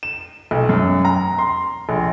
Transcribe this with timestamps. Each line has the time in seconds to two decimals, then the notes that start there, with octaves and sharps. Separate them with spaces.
0.03 E7
0.51 B1
0.69 F#2
1.05 A#5
1.39 C6
1.89 A#1